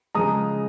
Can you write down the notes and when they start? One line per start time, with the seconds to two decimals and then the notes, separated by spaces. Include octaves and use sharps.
0.15 C#3 F3 G#3 A#5 D#6